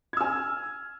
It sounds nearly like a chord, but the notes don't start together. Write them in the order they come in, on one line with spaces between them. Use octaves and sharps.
G#6 E6 G#5 F6